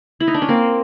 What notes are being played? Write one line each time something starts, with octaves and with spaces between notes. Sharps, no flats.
E4
D#4
D4
C#4
A#3 C4